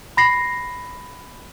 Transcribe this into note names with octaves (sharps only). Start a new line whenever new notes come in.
B5 A#6 C7